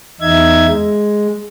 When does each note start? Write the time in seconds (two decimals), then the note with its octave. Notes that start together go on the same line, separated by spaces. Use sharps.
0.21 E2 D#4 E5 G#6
0.67 G#3